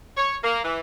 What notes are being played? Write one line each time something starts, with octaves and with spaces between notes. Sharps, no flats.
C#5
A#3
E3